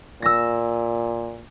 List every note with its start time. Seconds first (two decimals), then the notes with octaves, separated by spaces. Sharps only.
0.22 A#2 E6 A#6